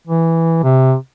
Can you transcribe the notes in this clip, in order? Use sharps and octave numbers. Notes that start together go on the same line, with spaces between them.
E3
C3